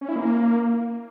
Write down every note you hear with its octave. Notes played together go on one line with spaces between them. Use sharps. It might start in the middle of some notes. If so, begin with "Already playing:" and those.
C#4
E4
A#3